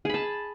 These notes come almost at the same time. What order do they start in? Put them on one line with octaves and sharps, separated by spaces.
G#4 B5 A5